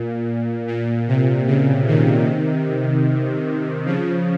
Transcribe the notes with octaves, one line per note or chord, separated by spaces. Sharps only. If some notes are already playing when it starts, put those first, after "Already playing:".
Already playing: A#2
A#2
C3
C#3
C3 D#3
C#3 F3